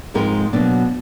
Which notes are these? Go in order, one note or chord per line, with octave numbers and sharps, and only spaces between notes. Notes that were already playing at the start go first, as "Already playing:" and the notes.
G#2 F3 G#3 C4 A#4
B2 F#3 A#3 D4